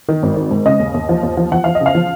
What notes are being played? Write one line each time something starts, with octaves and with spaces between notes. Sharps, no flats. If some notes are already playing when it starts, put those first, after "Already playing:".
D#3
G#1
D#3
G#2
C#3 D#5
D#2
D#2
F3
D#2
F3
F3 F#5
F3 F5
D#5
C#3 F5
F3